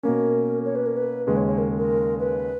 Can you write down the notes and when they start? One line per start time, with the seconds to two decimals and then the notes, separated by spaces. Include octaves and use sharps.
0.03 B2 A#3 C#4 A#4
0.65 C#5
0.75 B4
0.86 A#4
0.97 B4
1.27 D#2 C#3 G#3 C#4 B4
1.37 C#5
1.48 C#5
1.58 A#4
1.77 A#4
2.19 B4